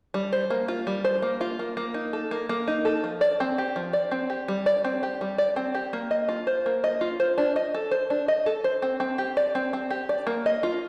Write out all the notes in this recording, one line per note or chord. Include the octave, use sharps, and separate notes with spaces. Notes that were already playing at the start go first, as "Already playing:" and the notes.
G3
C5
A#3
F4
G3
C5
A#3
F4
A#3
A#3
D#4
A4
A#3
A#3
D#4
A4
F3
D5
C4
G4
F3
D5
C4
G4
G3
D5
C4
G4
G3
D5
C4
G4
A#3
D#5
F4
C5
A#3
D#5
F4
C5
D4
D#5
A4
C5
D4
D#5
A4
C5
C4
C4
G4
D5
C4
C4
G4
D5
A#3
D#5
F4